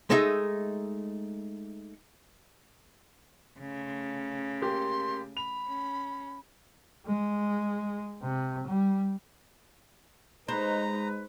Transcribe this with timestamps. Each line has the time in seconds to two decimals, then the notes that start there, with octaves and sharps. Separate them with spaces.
0.10 G#3 A3 D#4 E5
3.60 C#3 A3
4.62 A#3 G4 C6
5.37 B5 F7
5.68 C#4
7.07 G#3
8.23 C3
8.67 G3
10.48 G#3 D#4 B4 C5 A#5